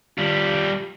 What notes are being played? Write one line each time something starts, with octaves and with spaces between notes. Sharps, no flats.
G3 F4